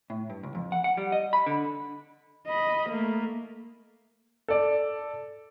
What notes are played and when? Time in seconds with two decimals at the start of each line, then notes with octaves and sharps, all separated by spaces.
0.10 A2
0.30 G2
0.43 C#2
0.55 F2
0.72 F#5
0.84 F#5
0.97 G3
1.12 D#5
1.33 B5
1.46 D3
2.48 D#5 B5
2.89 A3 A#3
4.48 A4 D5